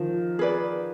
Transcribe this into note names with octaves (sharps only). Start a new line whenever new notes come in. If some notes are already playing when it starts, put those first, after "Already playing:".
Already playing: D#3 F3
G#4 B4 D5